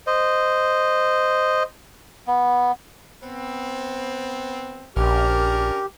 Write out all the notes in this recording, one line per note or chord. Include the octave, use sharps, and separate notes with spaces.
C5 D#5
B3
B3 C4
A#1 C#4 D4 G4 A#4